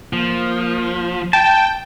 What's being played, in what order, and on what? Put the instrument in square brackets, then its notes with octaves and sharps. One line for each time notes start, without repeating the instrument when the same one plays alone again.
[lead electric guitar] F3 [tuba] A#3
[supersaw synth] G5 [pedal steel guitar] A5